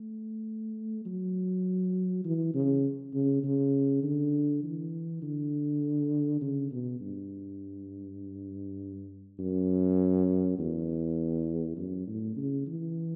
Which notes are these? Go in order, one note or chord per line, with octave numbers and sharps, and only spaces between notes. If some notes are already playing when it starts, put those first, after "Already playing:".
Already playing: A3
F#3
E3
C#3
C#3
C#3
D3
E3
D3
C#3
B2
G2
F#2
E2
F#2
A2
C#3
E3